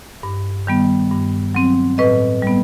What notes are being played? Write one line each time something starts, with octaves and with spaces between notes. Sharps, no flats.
G2
D#3 G3 B3
G2
F#3 C4
A2 B4 D#5
G3 B3